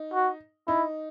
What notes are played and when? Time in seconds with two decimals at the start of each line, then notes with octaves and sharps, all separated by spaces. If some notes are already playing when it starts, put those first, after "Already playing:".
Already playing: D#4
0.14 F#4
0.68 D#4 E4